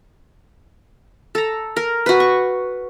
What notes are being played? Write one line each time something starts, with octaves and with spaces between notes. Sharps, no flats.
A4 A#5
A#4
F#4 B4
C#6